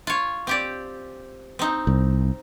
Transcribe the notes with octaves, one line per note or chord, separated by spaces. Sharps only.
F4 C#5
C4 G4 D5
C4 D#4
C2